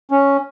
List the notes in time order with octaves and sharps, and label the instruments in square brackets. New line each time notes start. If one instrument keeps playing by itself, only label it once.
[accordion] C#4